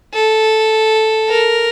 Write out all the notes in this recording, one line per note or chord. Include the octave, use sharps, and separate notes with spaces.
A4
A#4